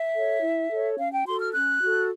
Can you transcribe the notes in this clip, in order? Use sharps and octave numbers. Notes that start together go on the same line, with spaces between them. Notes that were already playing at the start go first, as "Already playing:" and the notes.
Already playing: E5
A4 C#5
E4
A4 C#5
C#4 F5
G5
F#4 A4 C6
F6
C#4 F#6
F#4 A4